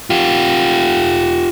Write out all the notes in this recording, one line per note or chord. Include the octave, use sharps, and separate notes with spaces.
F4 G4